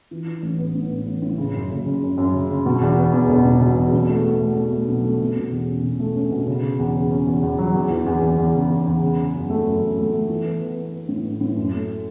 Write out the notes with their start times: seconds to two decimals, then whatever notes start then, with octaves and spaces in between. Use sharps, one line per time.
0.11 E3
0.26 E3
0.42 A1
0.58 B3
0.75 A2
0.90 B3
1.06 A1
1.22 A2
1.38 C#3
1.54 F#2
1.70 F#1
1.86 C#3
2.02 F#2
2.18 F#2
2.34 C#3
2.50 C#3
2.66 B2
2.81 E2
2.97 B3
3.13 E2
3.29 E1
3.45 B2
3.60 B2
3.77 E2
3.92 B2
4.09 A3
4.24 A3
4.40 A3
4.56 A3
4.72 A3
4.88 B1
5.04 A3
5.20 B2
5.36 B2
5.52 E2
5.68 C#4
5.83 B2
6.00 A3
6.16 C#4
6.31 B2
6.47 C#3
6.63 C#3
6.79 E2
6.95 C#3
7.10 C#4
7.27 E2
7.43 E2
7.58 F#3
7.74 E2
7.90 E3
8.06 E2
8.22 E2
8.38 E2
8.54 C#3
8.70 E2
8.86 E2
9.02 C#3
9.18 C#3
9.33 F#2
9.50 A3
9.66 F#2
9.81 F#2
9.97 A3
10.13 A3
10.29 E3
10.45 B3
10.61 E3
10.77 B3
10.93 B3
11.09 A2
11.25 B3
11.41 A2
11.56 F#2
11.72 A3